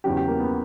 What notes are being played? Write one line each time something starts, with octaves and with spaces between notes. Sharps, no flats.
E2 C#3 F#3 G4
G4
A#3
B3